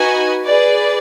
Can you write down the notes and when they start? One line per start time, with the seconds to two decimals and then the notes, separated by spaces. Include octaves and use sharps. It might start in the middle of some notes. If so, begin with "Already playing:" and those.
Already playing: D#4 F#4 B4 D#5 G#5
0.46 G#4 B4 D5